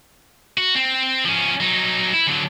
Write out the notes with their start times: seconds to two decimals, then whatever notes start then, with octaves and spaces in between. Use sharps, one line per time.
0.58 F#4
0.75 C4
1.25 F3 C#4
1.60 F#3 D#4
2.13 E4
2.27 D3 F#3